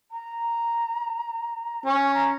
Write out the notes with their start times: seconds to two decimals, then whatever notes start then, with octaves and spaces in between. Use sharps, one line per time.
0.11 A#5
1.86 C#4 C#6
2.14 A#5